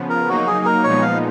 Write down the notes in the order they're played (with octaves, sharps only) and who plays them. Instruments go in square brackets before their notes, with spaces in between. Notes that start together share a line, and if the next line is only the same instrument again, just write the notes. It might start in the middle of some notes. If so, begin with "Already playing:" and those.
Already playing: [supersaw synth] C#3 F3 B3
[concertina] A#4
[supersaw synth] F#3 A#3 D#4 [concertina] F#4
[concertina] G#4
A#4
[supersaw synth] A#2 F3 G#3 B3 D#4 [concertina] C#5
[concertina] F5